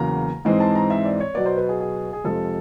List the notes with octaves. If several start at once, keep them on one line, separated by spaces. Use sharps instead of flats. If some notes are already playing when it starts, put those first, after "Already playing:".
Already playing: E2 C#3 F#3 A#3 A#5
G#2 E3 G#3 C4
A5
A#5
E5
D5
C#5
B2 F#3 B3 D5
C5
B4
G#4
G#4
G#4
F2 C3 F3 G#3 C4 A4